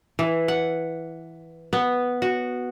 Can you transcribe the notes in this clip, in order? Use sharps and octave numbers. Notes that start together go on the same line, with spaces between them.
E3
F#5
B3
F#4